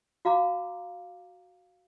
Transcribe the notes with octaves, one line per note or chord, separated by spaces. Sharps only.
F#4 F5 A#5 D6